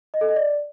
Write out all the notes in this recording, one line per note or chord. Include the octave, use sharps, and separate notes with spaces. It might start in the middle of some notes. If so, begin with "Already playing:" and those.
D#5
A4
D#5
D5